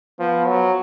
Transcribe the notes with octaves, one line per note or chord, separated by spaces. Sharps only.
F3 B3
F#3